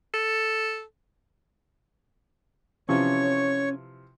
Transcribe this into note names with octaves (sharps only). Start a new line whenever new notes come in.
A4
C3 E3 F3 C#4 C#5 C#6